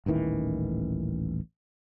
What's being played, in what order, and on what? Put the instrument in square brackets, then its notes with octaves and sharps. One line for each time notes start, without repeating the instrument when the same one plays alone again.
[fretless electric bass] D#1 A1 D#3 E3